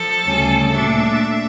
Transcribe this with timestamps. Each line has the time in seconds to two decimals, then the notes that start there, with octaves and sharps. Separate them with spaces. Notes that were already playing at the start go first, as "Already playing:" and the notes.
Already playing: F3 A4
0.24 D2 C#3 G3 C#4
0.74 A#2 A3 D4 E5